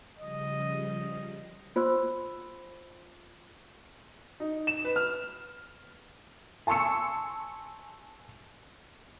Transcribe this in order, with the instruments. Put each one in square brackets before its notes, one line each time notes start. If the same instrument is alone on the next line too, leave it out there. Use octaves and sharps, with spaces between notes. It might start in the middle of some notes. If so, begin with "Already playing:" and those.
[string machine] C#3 F3 G3 [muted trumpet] D#5
[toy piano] F4 C5 C6 E6
[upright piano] D#4
E7
B4
F6
[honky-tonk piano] G#5 A5 C6 C#6 E6 C#7